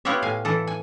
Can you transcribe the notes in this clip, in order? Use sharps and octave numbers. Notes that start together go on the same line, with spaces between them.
B3 E4 F4 G4 C#5 E5
A2 F5 G#5
E3 A4
G#5